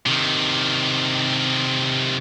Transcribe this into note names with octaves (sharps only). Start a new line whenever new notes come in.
C3 D#3